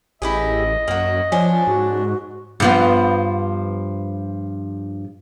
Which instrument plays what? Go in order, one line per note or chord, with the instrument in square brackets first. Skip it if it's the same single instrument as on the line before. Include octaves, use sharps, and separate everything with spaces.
[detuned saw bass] A1 [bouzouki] E4 G4 G#4 [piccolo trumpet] D#5
[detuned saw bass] F#2 [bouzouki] A#3 F#4
[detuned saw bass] F3 [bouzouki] C#4 D4 C5
[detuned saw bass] G#2 [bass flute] F#4
[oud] G2 F3 B3